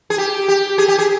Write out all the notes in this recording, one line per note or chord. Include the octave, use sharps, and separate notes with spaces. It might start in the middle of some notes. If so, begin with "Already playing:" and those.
G#4
G4
G4
G#4
G4
G#4